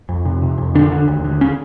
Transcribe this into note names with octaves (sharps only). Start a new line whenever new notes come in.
F2
C3
C3
F2
D3 D4
D3
D#2
D3
C#4